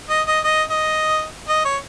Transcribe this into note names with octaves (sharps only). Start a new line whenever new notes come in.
D#5
D#5
D#5
D#5
D#5
C#5